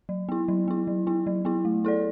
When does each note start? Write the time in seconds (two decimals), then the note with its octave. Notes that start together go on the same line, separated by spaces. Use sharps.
0.09 F#3
0.29 B3 E4
0.48 F#3
0.68 B3 E4
0.87 F#3
1.07 B3 E4
1.27 F#3
1.45 B3 E4
1.65 A3
1.85 E4 A4 D5